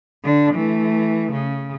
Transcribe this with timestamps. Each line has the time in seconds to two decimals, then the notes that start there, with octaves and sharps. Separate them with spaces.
0.23 D3 D4
0.54 E3 A3
1.32 C#3